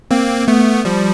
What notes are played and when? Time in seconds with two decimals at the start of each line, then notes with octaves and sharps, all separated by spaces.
0.11 A#3 C4
0.48 A3 B3
0.85 F3 G3